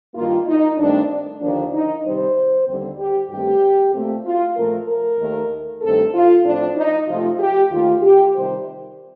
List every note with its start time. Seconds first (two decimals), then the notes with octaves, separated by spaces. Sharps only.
0.15 G2 D#3 A#3 F4
0.47 D#4
0.78 G2 D#3 A3 C4 D4
1.41 D#2 D3 F3 A#3 D4
1.73 D#4
2.04 C3 D#3 G3 C4 C5
2.67 D#2 D3 G3 C4
2.98 G4
3.30 G2 D#3 A3 C4 G4
3.93 A#2 A3 C4
4.25 F4
4.56 A#2 F3 A3 C4 A#4
4.87 A#4
5.19 D#2 D#3 A3
5.82 G2 D#3 A3 C4 A4
6.14 F4
6.45 A2 F3 C4 D4
6.76 D#4
7.08 C3 F3 A3 C4 F4
7.40 G4
7.71 D#2 D#3 A3 F4
8.02 G4
8.34 C3 D#3 G3 C5